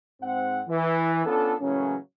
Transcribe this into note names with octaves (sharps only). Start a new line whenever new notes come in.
G#2 C4 F#5
E3
B3 C#4 D4 F4 A4
A2 C#3 E3 F#3 A#3 C#4